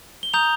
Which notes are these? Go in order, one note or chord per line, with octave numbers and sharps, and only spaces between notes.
G7
A#5 D#6 G6 F7